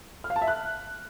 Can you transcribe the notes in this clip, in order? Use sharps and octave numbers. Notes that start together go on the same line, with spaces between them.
F6
F5
A5
E5
F#6